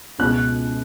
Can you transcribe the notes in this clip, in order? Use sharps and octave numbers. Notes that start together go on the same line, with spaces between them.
C#2 B2 G#3 F#6